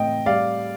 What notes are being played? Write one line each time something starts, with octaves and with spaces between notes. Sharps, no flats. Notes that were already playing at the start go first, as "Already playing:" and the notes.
Already playing: A2 C4 D#5 G5
G3 D5 F5